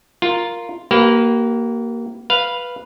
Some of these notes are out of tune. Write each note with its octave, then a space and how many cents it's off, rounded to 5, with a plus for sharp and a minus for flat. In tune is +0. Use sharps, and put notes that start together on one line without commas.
F4 +0 A#4 +0
A#3 +0 G4 -40 B4 +0
B4 -5 F5 +0